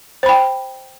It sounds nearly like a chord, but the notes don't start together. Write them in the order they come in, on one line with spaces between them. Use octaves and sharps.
C5 B5 G5